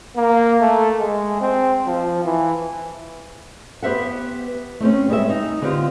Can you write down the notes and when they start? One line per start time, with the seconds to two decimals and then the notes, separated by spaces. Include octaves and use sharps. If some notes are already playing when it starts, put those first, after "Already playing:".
0.16 A#3
0.61 A3
1.00 G#3
1.41 C4
1.87 F3
2.24 E3
3.83 B3 G4 C5 E5 F#5
4.80 A3 C4 C#4
5.08 G3 G#3 B3 E5
5.29 D#4
5.62 D3 B3 C4 F4 G4